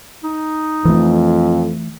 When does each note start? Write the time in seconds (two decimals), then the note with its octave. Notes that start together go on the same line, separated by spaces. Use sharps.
0.24 D#4
0.85 F2 E3 A3